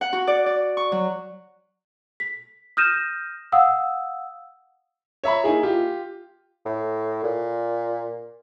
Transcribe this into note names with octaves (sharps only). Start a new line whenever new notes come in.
F#5
F#4
D5
D5
C#6
F#3
B6
D#6 F6 G6 A#6 D#7 E7
F5 F#5 D#6 E6
C#5 E5 A#5 B5
A#3 D#4 E4 G#4
F4 G4
A2
A#2